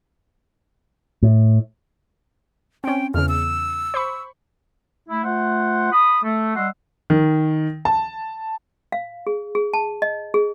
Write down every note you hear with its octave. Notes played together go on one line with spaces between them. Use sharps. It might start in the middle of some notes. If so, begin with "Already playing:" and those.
A2
C4 C#4 G5
E2 C#3 F6
E6
C5 B5 C#6
A3 E4
A3 F4 C5 F#5
B5 D#6
A3
G3 D#5 F#5 C6 E6
D#3
A5
F5
G#4
G#4
A5
D#5
G#4